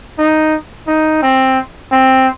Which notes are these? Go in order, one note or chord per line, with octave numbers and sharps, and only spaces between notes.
D#4
D#4
C4
C4